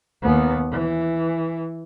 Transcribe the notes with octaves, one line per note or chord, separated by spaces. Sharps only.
D#2 B3
E3